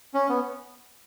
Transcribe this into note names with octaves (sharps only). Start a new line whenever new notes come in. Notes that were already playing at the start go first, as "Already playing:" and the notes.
C#4
B3